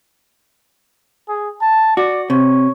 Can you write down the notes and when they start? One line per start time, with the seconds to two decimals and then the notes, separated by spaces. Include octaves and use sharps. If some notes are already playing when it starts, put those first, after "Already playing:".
1.29 G#4
1.62 A5
1.97 F#4 D5
2.30 C3 C#5